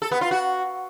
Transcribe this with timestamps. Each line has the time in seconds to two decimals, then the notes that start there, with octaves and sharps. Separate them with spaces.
0.02 A4
0.12 B3
0.21 F4
0.31 F#4